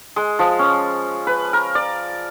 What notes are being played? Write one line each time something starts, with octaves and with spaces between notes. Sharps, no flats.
G#3
F3
C#4
B4
A#4
D5